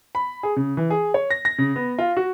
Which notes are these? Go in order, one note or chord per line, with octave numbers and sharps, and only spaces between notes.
B5
G#4
C#3
E3
G#4
C#5
A#6
A#6
C#3
B3
F4
F#4